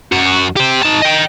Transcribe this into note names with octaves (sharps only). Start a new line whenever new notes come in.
F#2 F#4
G4 C5
D#4 A5
D#5 G5